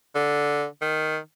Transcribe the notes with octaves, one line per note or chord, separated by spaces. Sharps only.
D3
D#3